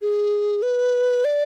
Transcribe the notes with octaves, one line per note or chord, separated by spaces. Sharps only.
G#4
B4
D5